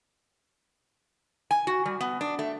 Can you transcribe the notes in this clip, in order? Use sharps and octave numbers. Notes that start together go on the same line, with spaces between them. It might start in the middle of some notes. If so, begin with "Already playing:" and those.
G#5
F#4
G3
B3
D4
A3